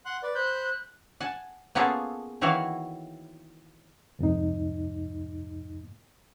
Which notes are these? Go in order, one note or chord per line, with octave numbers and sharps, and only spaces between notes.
F#5 C6 F#6
B4 D5
C5 B5 F#6 G6
F#5 G#5 A5
A#3 B3 C#4 F4 G#4 A4
D#3 E3 E4 F#4 C#5 F5
C2 F2 G#2 D#4